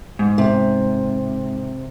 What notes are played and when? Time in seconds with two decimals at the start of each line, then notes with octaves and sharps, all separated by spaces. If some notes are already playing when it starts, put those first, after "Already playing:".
0.19 G#2
0.38 C3